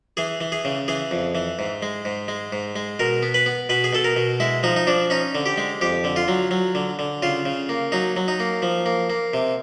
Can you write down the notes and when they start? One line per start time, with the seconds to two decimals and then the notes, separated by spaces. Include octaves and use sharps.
0.17 E3 G#4
0.41 E3
0.52 G#4
0.65 C#3
0.88 E3 G#4
1.11 F2
1.35 E3
1.59 G#2
1.83 G#3
2.05 G#2
2.28 G#3
2.53 G#2
2.76 G#3
2.99 B2 A#4
3.23 B3
3.34 B4
3.46 B3
3.69 B2 B4
3.84 G#4
3.93 B2 A4
4.04 A#4
4.16 B2
4.40 G#3 E4
4.63 F3 D#4
4.76 D#4
4.87 F3 D4
5.10 C#4 D#4
5.35 D3
5.46 G4
5.58 G#3
5.81 F2 G4
6.04 D3
6.16 F4
6.28 F#3
6.51 F#3
6.75 D3
6.99 D3
7.23 C#3 F4
7.45 C#3
7.69 A#3
7.92 F#3 D#4
8.17 F#3
8.28 D#4
8.40 A#3
8.62 F3
8.86 A#3
9.10 A#3
9.34 C3